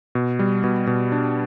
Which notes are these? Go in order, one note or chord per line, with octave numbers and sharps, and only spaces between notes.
B2
G3
B2
B2
D4